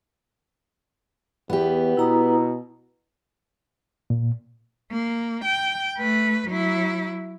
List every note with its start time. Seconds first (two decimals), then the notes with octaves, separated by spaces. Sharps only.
1.50 E2 B3 G4
1.97 B2 E4 A#5 D#6
4.10 A#2
4.92 A#3
5.45 G5
5.98 A3 B4
6.48 F#3 E4